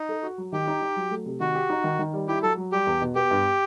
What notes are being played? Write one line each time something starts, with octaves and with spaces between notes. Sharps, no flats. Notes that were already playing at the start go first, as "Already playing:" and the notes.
Already playing: D#4
A4
F#4
F#3
D#3 G4
D#4
D#4
F#3
A3
C3
D#3 F#4
G4
D#4
D#3
D#3
G3
E4 G4
F#3 A4
F#3
G3 G4
E2
B2
B3 G4
G2